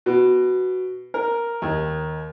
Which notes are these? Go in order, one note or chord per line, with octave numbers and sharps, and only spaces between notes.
B2
A#4
D#2